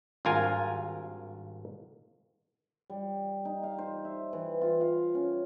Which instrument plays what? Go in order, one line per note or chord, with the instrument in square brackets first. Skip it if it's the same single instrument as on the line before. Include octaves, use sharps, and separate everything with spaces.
[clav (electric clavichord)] G#1 G2 F4 A#4 G#5
[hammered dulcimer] G3
D#4
F5
C5
E5
E3
F4
F5
C#4